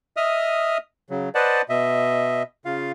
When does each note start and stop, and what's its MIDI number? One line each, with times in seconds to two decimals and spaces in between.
0.17 0.78 75
0.17 0.78 76
0.17 0.78 87
0.17 0.78 89
1.10 1.29 49
1.10 1.29 54
1.35 1.62 71
1.35 1.62 72
1.35 1.62 74
1.35 1.62 75
1.35 1.62 78
1.35 1.62 81
1.69 2.43 47
1.69 2.43 75
1.69 2.43 76
2.65 2.92 49
2.65 2.92 65
2.65 2.92 77